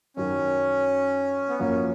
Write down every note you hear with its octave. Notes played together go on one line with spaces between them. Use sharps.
F#2 D#3 F#3 C#4
B3
F#2 F3 A#3 C#4